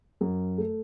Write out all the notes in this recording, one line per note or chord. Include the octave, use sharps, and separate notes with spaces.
F#2
A3